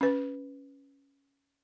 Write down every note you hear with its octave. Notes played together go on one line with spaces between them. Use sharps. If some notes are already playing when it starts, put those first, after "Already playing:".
C#4 B4